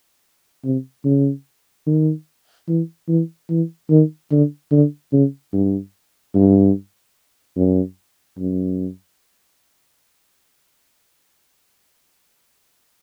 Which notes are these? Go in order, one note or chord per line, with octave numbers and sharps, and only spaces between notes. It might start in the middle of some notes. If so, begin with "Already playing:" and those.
C3
C#3
D#3
E3
E3
E3
D#3
D3
D3
C#3
G2
G2
F#2
F#2